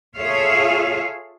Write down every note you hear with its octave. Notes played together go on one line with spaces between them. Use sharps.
F4 G#4 A4 C#5 E5 F5